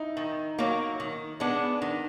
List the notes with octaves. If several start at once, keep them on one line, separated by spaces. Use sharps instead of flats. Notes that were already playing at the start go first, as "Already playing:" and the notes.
Already playing: D#4 E4
D#3
F#3 A#3
D#3
G#3 B3 D4
D#3 D4